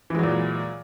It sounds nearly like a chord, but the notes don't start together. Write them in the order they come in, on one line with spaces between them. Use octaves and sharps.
E3 G#3 F#3 A#2